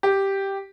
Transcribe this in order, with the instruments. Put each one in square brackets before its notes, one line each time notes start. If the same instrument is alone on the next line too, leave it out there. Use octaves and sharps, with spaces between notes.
[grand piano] G4